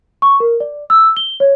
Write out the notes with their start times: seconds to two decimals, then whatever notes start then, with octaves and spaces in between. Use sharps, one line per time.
0.22 C#6
0.40 A#4
0.60 D5
0.90 E6
1.17 G7
1.40 C#5